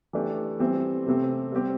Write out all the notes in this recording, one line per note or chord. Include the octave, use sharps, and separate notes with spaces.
E3 A3 D4 G4
E3 G3 C4 G4
C3 A3 C4 G4
G3 C4 G4